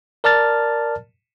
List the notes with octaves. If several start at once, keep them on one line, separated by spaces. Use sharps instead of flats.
A#4 D5 A5 F6 A6